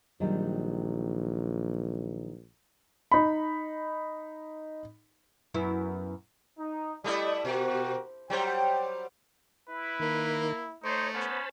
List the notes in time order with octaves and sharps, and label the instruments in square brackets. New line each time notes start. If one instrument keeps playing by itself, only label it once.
[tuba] A#1 [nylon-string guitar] D#3 F#3 G3
[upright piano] D#4 B5
[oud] F#2 B3 E4
[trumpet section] D#4
[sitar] G3 A3 E4 [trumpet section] D5 D#5
[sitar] B2 [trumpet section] F#4 G4 A#4
[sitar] F#3 G3 C5 [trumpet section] G5
[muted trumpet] E4 [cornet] B4
[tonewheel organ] D#3 [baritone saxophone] A#3
[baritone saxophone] A3 [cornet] D#4 [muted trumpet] C5 [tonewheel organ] C#5
[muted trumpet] B3 [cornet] C#4 [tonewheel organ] C5 A5 B5